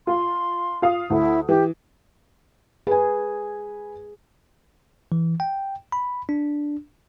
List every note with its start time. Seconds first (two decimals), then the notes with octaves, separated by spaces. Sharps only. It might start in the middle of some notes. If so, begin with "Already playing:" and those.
0.07 F4 F5 C6
0.82 F4 F5 D#6
1.10 D2 E4 A4
1.49 E3 G4
2.87 G#4 B4 G#5
5.12 E3
5.40 G5
5.92 B5
6.29 D4